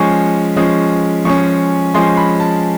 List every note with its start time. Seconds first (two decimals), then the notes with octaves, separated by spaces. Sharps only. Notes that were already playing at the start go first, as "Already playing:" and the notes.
Already playing: F3 G#3 C#4 C#6
0.56 F3 G#3 C#4
1.25 F3 G#3 C#4 C#6
1.94 F3 G#3 C#4 C6
2.17 B5
2.40 A5